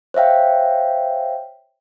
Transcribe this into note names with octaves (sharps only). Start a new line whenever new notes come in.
C5 C#5 E5 F5 G5